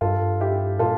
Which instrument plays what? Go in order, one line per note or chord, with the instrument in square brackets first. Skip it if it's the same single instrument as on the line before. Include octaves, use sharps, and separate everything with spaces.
[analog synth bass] G2 [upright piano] F4 A4
[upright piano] E4 G4
[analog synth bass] A#2 [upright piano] F4 A4